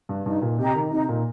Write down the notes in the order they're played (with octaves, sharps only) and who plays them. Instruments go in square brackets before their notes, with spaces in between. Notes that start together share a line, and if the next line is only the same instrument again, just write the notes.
[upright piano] G2
[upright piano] G2 [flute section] D#4
[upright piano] A#2
[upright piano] C3 [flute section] G4 D#5 A#5
[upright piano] D#3
[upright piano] C3 [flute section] D#4
[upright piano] A#2